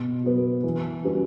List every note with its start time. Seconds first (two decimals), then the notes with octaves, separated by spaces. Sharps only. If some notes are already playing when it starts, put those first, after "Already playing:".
Already playing: B2
0.24 F#3 B3
0.63 E3
1.04 G3 C#4 F#4 B4